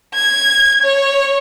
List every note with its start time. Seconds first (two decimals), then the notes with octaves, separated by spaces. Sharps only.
0.15 G#6
0.83 C#5